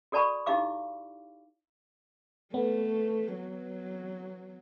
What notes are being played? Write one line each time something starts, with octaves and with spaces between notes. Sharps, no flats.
F#4 A4 D5 A5 B5 C#6
D#4 E4 G4 F5 D6
A3 B3
F#3